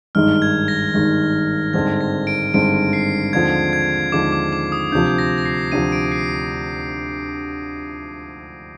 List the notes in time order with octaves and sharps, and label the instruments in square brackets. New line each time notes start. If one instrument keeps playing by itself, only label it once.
[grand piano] G#1 G2 D#3 G#3 D#4 [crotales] F6
[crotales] G#6
A#6
[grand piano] G#1 G2 D#3 G#3 D#4
[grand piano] G#1 G2 D3 G#3 C4 [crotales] G#6
[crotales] A#6
D7
[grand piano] G#1 G2 D3 G#3 C4 [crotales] D7
[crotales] C7
[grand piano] D#2 D3 F3 G#3 C4 [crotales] G#6
[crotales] G#6
[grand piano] D#2 D3 F3 G#3 C4 [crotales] D6
[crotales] D6
D6
D#6
[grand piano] D2 C3 F3 [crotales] G6
[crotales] A#6
A#6
C7
[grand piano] D2 C3 F3 [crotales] D#7
[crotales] D7
C7